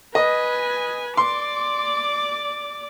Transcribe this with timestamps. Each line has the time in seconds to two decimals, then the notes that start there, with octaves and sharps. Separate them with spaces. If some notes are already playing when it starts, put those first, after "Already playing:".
0.15 B4 D#5 G#5
1.17 D5 C6 D6